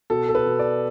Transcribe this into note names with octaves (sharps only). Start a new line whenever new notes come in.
B2 A4
A4
B4
B2
D5